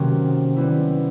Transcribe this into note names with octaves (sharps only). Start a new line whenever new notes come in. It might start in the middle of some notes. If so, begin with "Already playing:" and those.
Already playing: C3 D#3 F#3 A#3 C#4
G3 B3 E4